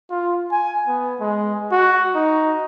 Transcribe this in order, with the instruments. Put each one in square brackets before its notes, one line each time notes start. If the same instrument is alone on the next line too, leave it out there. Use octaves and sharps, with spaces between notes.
[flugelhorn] F4
G#5
B3
G#3
F#4
D#4